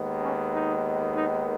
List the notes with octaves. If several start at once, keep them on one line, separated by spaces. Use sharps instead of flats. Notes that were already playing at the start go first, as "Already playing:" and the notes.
Already playing: D#2 D#3 G#3 B3
C#4
D#4
D#4